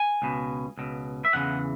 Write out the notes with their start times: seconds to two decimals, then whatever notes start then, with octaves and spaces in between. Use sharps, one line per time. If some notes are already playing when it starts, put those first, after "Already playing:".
Already playing: G#5
0.22 C#2 B2
0.78 C#2 B2
1.25 E5
1.33 E2 C#3 E3 F#5